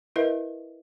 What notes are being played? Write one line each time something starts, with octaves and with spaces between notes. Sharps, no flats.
E4 A#4 B4 D#5 E5